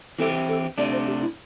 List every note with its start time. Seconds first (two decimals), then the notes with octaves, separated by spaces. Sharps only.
0.19 E3 C4 E4 G4 A4
0.48 A4
0.78 C3 A3 D4 D5
0.92 C5
1.06 G4
1.21 E4